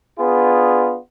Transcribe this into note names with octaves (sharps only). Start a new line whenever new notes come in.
B3 D4 F4 G#4